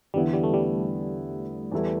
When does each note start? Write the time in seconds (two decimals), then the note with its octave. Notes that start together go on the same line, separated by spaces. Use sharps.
0.14 E2 D3 G3 B3 E4
0.33 G3
0.43 A3
0.54 G3
1.72 E2 E3 G3 E4 A4